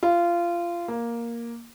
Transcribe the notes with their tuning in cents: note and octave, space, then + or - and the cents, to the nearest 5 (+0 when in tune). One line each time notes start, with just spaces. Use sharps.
F4 -20
A#3 +5